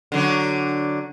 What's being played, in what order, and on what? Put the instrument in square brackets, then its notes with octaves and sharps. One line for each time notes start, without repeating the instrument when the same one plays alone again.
[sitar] D3 F#3 D4